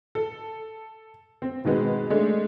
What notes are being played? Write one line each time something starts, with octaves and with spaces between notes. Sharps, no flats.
A4
C4
B2 D#3 G#3 B3 C4
G#3 A3 D4